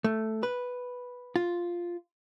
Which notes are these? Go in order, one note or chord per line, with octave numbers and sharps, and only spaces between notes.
A3
B4
F4